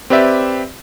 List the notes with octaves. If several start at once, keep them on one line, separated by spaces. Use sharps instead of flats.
C4 G4 B4 D5 E5